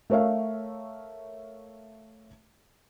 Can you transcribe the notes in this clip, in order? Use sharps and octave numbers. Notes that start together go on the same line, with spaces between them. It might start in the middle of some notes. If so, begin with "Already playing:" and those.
A3 A#4 C#5 E5 F5